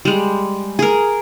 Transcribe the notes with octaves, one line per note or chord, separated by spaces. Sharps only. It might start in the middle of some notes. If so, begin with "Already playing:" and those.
G3 G#3
G#4 A#4